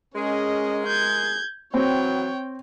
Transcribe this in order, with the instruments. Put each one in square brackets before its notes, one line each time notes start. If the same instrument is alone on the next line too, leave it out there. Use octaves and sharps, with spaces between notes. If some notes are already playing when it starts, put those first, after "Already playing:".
[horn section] G#3 G#4 A#4 [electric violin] C#4 D#5
[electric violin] G6 G#6
[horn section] E3 F#3 [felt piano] C4 [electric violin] C#5 G5